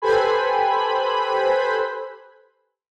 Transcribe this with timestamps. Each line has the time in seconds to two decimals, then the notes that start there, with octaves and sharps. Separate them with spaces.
0.02 G4 A4 B4 C5 G#5 B5